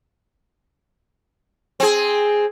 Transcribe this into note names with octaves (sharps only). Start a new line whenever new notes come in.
C4 G#4